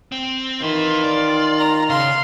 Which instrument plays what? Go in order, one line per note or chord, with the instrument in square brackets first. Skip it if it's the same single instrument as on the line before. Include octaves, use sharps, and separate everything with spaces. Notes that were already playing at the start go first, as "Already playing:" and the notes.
[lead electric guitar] C4
[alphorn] D#3 [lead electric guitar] E3 B4 [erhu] F4
[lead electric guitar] D5
[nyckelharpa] A#5
[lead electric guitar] C#3 [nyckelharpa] F5 C6